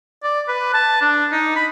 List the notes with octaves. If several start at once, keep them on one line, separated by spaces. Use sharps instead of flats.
D5
B4
A5
D4
D#4
B5